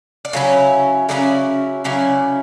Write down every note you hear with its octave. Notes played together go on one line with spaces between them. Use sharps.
D5
C#3 F#3 C#4 E4 C#5
C#3 F#3 C#4 E4 D5
C#3 F#3 C#4 E4 D5